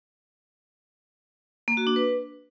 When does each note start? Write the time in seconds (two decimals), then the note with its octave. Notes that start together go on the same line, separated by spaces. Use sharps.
1.68 A#3
1.77 F#4
1.87 D4
1.96 B4